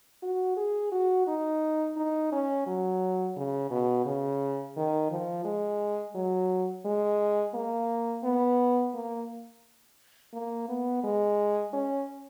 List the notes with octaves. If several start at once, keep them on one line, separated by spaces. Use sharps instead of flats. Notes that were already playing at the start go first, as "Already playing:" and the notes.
F#4
G#4
F#4
D#4
D#4
C#4
F#3
C#3
B2
C#3
D#3
F3
G#3
F#3
G#3
A#3
B3
A#3
A#3
B3
G#3
C#4